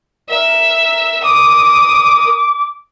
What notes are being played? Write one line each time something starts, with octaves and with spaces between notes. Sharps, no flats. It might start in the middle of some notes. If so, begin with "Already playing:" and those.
A#4 E5
D6 D#6